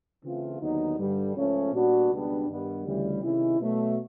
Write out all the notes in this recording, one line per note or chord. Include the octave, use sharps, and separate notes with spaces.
C#3 E3 A3 C4 F4
D#2 D3 F#3 B3 D#4
G2 D3 G3
C#2 C#3 F3 A3 C#4
A#2 G3 B3 D4 F#4
C#2 B2 G3 B3 D4
G2 D#3 G3 B3
D2 C#3 E3 G3
C3 D#3 G#3 C#4 E4
B2 F#3 A3